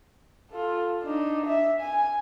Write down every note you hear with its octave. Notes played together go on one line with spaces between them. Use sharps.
F4 A4
D4 D#4
E5
G#5